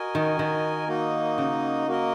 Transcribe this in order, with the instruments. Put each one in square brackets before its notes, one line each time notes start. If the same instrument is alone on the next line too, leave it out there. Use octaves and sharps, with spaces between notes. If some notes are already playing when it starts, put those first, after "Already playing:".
Already playing: [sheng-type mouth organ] F#4 A#4 D#5 G#5
[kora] D#3
D#3
[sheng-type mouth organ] A#3 D#4 F#4 D#5
[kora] C#3
[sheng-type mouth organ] A#3 F#4 A#4 D#5